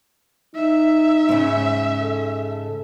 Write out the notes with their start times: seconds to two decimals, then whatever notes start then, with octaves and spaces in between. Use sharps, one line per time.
0.55 D#4 E5
1.29 G#2 C#3
2.02 A4